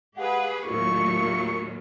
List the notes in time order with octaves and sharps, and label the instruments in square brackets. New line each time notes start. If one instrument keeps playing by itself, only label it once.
[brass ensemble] G#3 F5 F#5 [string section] G4 G#4 B4
[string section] D#2 A2 F#3 [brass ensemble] D4 E4 F4 [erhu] C#6